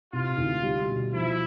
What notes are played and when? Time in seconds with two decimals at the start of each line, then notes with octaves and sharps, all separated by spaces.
0.13 C3 F4
0.38 D2
0.63 G3
0.88 B2
1.13 F3 E4